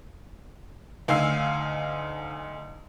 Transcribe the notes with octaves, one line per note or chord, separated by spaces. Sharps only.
D2 D#4 F5 G#5 E6 C7